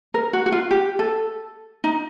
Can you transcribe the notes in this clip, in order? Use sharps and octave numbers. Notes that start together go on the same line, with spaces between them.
A#4
F#4
F#4
F4
G4
A4
D#4